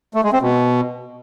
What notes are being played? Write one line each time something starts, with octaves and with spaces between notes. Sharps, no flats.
A3
G#3
C4
B2